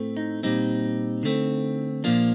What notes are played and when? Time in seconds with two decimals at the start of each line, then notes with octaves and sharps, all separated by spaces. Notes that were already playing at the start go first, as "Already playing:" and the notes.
Already playing: A2 A3 C4
0.17 D#4
0.43 A#2 G3 C4 D#4
1.23 D3 A3 C4
2.04 A#2 F3 A#3 D4